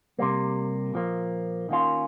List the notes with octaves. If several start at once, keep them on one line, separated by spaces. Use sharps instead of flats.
C3 G3 A#3
A#2 F3 A#3
D#3 A#3 C#4 F4